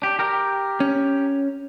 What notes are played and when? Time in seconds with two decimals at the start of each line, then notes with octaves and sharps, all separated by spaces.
0.02 D4 G4
0.19 G4 A#4
0.80 C#4